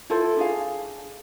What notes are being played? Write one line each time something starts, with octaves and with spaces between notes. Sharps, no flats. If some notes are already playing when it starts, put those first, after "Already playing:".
E4 F4 A4 C5
D4 G#4 F5